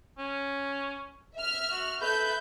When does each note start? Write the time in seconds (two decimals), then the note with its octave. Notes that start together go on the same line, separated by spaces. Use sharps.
0.18 C#4
1.36 E5 F6
1.71 F#4
2.02 A4 B4 E5 G6